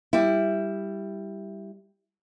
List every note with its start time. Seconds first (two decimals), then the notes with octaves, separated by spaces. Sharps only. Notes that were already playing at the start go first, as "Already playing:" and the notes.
0.13 G3 E4